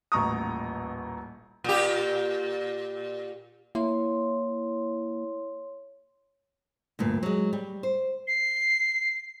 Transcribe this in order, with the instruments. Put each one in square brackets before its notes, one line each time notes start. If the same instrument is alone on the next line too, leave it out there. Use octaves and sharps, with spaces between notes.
[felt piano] D#1 A1 A#5 C#6 D#6
[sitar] A#2 G4
[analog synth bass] A#3 [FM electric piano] E4 [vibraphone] C#5 C6
[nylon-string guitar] D2 G2 A#2
F#3 G#3
G3
C5
[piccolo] C7